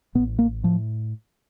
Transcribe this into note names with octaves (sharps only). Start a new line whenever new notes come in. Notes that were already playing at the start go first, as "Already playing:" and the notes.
A1 A2 B3
A#3
A2 F3